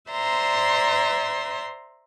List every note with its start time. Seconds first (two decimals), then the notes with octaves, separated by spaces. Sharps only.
0.11 C5 D5 E5 A#5 C6